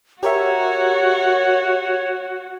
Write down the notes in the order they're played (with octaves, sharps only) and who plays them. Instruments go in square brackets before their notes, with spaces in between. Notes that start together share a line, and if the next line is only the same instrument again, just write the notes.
[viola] F#4 [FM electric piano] G4 A#4 E5 [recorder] C#5